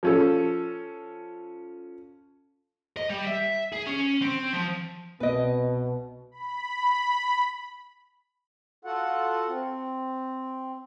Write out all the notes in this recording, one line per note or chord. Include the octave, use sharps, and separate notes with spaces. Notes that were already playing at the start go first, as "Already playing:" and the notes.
F3 C#4 A4
D#5
G3
E5
G#4
C#4
C4
F3
C2 B2 B3 B4 D#5 D7
B5
F4 F#4 A4 F#5
C4